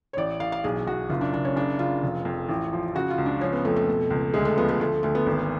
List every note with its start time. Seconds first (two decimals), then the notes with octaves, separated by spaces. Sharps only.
0.13 C#5
0.17 A1 D5
0.40 A1 F5
0.52 F5
0.64 B1 G#4
0.87 B1 F#4
1.10 F#1 F4
1.21 D4
1.33 F#1 D4
1.45 C#4
1.56 C#3 D4
1.79 C#3 F4
2.03 F1
2.25 F2
2.49 A1
2.73 F3
2.95 C#3 F#4
3.10 F4
3.18 C#2
3.26 D4
3.41 F3 C#4
3.53 B3
3.65 F2 A3
3.76 A3
3.88 B2
4.10 C#2
4.34 D2 G#3
4.45 A3
4.57 F3 B3
4.68 A3
4.80 D2 A3
5.03 D2 A3
5.15 B3
5.26 G#1